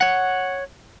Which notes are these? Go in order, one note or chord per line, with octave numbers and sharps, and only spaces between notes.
C#5 F#5